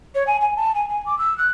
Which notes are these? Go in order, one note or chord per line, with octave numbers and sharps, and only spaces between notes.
C#5
G#5
G#5
A5
G#5
G#5
D6
E6
F#6